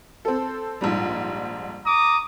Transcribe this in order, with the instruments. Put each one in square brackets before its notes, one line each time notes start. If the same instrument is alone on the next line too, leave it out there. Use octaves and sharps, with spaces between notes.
[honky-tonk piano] C4 A4
A#1 G#2 G3
[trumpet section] A#5 D6 D#6